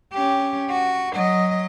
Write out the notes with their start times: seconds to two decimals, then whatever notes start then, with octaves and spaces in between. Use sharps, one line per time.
0.13 C#4 G4
0.70 F#4
1.13 F#3 D#5